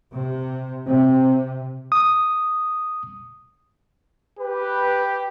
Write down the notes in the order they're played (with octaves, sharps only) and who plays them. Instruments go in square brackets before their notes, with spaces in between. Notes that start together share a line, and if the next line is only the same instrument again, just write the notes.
[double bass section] C3
[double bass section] C3 [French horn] C4
[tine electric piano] D#6
[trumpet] G4 [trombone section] B4